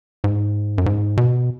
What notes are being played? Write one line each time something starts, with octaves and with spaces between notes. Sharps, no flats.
G#2
F#2
G#2
B2